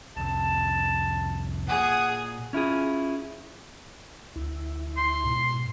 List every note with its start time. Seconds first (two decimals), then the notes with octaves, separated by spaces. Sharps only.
0.17 C2 F2 A5
1.68 A#2 G#4 F#5 D#6
2.53 C#4 E4 F4 G#4
4.36 D2 E4
4.97 C6
5.25 G#2 B2